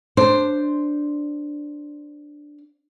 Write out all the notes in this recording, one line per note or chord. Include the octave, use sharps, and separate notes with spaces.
D4 C5